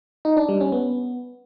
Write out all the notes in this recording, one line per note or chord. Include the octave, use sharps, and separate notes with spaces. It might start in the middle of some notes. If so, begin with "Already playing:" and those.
D#4
D4
G3
C#4
B3